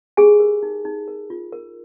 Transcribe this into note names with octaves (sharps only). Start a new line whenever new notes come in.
G4 G#4 G#5
A#4
D#4
D#4
A#4
F4
A#4